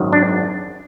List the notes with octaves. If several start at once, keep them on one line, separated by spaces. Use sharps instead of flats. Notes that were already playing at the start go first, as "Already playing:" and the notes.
Already playing: G#1 F#2 D#3 F#3
D4